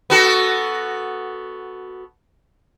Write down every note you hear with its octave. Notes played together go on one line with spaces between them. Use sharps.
B3 F#4 A4